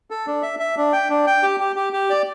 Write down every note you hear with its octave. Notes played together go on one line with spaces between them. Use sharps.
A4
D4
E5
E5
D4
G5
D4
G5
G4
G4
G4
G4
D5